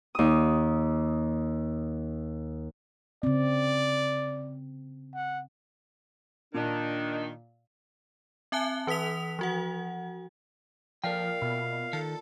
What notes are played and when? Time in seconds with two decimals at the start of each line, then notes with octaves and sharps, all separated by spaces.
0.15 D#2 D#6
3.23 C#3 C4 D5
5.14 F#5
6.54 A#2 D#3 D4
8.52 C4 E5 G#5 A5 F#6 G7
8.87 E3 B4 D#6 B6 F7
9.39 F3 F#4 F#5
11.04 A#2 F3 A#4 D5 F5 G5
11.41 B2 E5
11.93 D#3 A4